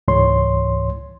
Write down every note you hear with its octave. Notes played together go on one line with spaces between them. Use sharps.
C#2 G#2 E3 C#5 C6